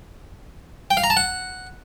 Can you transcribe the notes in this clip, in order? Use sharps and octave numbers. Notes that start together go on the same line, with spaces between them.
G5
F5
A#5
A5
F#5